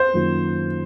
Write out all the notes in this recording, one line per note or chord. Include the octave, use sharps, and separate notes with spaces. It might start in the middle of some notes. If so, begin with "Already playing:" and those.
Already playing: C5
F#2 D#3 A#3 F4